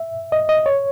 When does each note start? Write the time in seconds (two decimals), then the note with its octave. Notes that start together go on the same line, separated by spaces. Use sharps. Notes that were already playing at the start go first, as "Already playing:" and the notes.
Already playing: E5
0.32 D#5
0.49 D#5
0.66 C#5